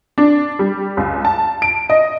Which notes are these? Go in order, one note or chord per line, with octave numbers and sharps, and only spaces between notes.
D4
G3
C#2
A5
D7
D#5